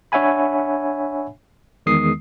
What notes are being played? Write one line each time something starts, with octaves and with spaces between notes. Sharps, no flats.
D4 C#5 E5 F#5 G#5 B5
E2 D#3 G#3 D#6 C7